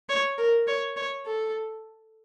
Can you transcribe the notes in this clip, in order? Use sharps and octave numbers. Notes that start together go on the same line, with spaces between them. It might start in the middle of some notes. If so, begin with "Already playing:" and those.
C#5
A#4
C#5
C#5
A4